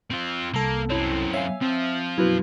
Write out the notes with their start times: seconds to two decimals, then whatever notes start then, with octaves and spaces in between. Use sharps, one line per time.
0.10 C4 F4
0.54 C2 A#3 A4
0.90 F#2 C4 E4 C#5
1.34 C#5 E5 F5 G#5
1.61 F3 C4
2.18 F#2 B2 E4 F#4 B4